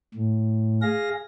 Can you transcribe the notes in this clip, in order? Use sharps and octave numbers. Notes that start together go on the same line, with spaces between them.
A2
G#4 F5 A#6